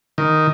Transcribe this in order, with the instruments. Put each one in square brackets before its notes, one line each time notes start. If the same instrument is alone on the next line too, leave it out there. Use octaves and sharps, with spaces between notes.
[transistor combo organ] D#3